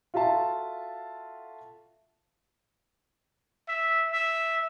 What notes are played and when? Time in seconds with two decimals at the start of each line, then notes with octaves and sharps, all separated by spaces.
0.14 F4 F#4 A4 E5 F5 A5
3.68 E5
4.12 E5